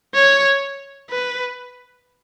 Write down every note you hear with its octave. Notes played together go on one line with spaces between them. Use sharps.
C#5
B4